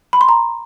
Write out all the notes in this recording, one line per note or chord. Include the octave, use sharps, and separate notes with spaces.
B5
C6
A#5